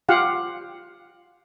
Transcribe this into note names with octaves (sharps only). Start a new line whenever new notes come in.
F4 G4 F5 F#5